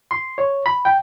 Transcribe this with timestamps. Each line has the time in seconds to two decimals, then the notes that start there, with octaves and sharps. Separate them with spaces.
0.11 C6
0.38 C#5
0.66 B5
0.85 G5